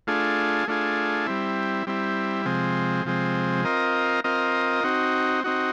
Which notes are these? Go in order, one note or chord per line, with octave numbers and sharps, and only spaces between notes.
A3 D4 F4 G#4
A3 D4 F4 G#4
G3 C4 E4
G3 C4 E4
C3 F3 G#3 C4
C3 F3 G#3 C4
C4 F4 A#4 D#5
C4 F4 A#4 D#5
C4 D#4 F#4
C4 D#4 F#4